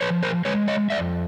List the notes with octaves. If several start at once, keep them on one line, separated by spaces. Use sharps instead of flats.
F3 B4 C#5
A#4 C5
G#3 B4 C#5
C#5 D#5
F2 D5 E5